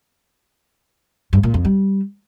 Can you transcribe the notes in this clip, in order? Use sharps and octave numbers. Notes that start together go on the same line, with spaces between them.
G2
A#2
F2
G3